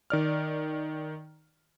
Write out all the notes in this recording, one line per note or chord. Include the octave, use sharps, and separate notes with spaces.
D#3 D5 F6